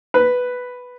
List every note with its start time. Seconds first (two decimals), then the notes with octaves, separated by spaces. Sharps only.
0.14 B4